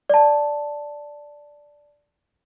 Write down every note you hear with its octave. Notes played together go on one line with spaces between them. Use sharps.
D5 A5